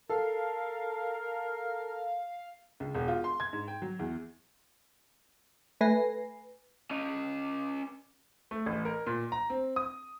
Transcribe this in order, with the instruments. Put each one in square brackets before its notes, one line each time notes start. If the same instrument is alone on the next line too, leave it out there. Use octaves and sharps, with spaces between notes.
[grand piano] A4 [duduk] A#4 [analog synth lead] F5
[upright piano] C#2
E1
F4
C6
G#6
G#2
G5
F#3
E2
[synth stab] A3 B4 G#5 A#6 C7
[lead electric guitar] C#4 D#5
[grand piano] A3
A1
A#4
A#2
A#5
C4
D#6